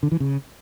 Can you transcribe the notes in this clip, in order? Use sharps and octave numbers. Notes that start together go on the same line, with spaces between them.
D3
E3
C#3